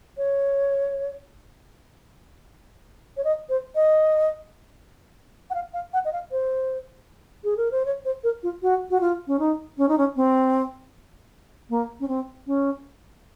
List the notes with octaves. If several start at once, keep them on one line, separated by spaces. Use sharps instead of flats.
C#5
C#5
D#5
C5
D#5
F#5
F5
F5
F#5
D#5
F5
C5
G#4
A#4
C5
C#5
C5
A#4
F4
F#4
F#4
F4
C#4
D#4
C#4
D#4
C#4
C4
A#3
C#4
C4
C#4